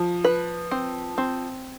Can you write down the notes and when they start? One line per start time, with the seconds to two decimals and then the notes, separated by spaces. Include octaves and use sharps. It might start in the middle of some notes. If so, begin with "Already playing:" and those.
Already playing: F3
0.24 B4
0.71 C4
1.18 C4